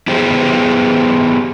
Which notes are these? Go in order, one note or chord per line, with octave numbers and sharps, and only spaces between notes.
B3 E4 G4 G#4 C5